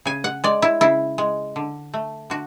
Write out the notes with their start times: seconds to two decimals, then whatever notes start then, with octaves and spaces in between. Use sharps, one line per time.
0.05 C#3 G#5
0.24 F#5
0.44 G#3 D5
0.62 E4
0.81 C#3 E4
1.18 G#3
1.56 D3
1.94 A3
2.30 D3 F#4